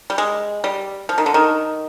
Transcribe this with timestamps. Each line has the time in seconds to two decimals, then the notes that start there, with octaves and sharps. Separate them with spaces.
0.10 G3
0.18 G#3
0.64 G3
1.09 F3
1.18 D#3
1.26 D3
1.34 D#3